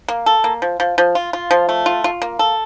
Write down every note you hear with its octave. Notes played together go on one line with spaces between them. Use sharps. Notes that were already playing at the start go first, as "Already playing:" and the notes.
A#3
A4
A#3
F3
F3
F3
F4
F4
F3
A3
F4
F4
A#3
A4